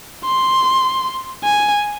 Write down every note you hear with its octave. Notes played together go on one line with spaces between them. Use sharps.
C6
G#5